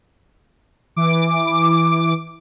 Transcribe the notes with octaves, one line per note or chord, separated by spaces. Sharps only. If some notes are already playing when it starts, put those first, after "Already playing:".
E3 D6